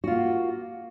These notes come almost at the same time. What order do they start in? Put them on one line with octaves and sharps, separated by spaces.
F#4 F4 A#3